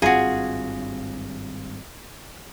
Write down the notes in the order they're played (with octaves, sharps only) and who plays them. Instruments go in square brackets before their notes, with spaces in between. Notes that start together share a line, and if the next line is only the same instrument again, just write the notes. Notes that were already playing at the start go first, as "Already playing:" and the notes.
[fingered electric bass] G#1 G2 C4 [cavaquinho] D#4 F#4 [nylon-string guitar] F4 [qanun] G#4